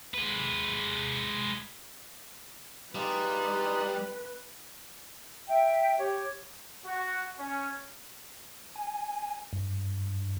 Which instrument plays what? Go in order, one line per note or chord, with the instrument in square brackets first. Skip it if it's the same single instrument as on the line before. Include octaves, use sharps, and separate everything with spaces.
[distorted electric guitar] G#3 B4
[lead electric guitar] G3 [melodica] D#4 F4 G#4 [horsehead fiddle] B4
[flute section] E5 G5
G4 C#5
[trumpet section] F#4
C#4
[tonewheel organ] G#5
G2